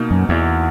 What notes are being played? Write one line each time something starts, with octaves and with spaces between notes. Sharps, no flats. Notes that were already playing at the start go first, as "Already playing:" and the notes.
Already playing: B2 A#3 D#4
F#2
E2